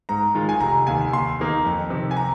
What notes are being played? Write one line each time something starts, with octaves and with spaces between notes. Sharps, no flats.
G#2 A#5
D#3 G#3 F4
G#5
F1 A#5
D#2 D#3 G#5
D#2 C6
D#3 A#3 D#4
F2
C3 D#3
G#5
A#5